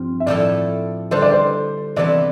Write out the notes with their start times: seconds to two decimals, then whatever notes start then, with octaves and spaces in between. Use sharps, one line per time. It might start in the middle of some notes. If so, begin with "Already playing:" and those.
Already playing: G2 F3 C4 F4
0.20 E5
0.26 A2 F3 A3 E4 A4 D5
1.11 D3 G3 D4 A4 C5
1.22 D5
1.32 C5
1.96 C3 E3 B3 E4 A4 D5